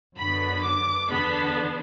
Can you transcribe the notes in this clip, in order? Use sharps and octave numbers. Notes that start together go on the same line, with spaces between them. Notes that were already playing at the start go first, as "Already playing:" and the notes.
F#2 D3 F#3 B3 B5
D6
E2 D3 B3 D4 B5